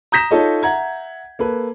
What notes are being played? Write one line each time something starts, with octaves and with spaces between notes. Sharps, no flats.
A#5 D#6 G6 A#6 B6 E7
D#4 F4 A4 C#5 D#5
E5 F#5 A#5 G#6
A#3 A4 B4